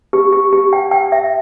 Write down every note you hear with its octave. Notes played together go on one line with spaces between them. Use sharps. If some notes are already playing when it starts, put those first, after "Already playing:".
G4
G4
G4
G5
G5
E5